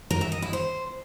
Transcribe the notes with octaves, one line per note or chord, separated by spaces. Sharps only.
A#4
E5
D#5
E4
C5